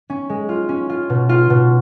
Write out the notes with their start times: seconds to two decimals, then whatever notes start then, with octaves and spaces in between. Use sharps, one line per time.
0.10 C#4
0.30 G#3
0.49 F4
0.69 C#4
0.90 F4
1.10 B2
1.29 F4
1.50 B2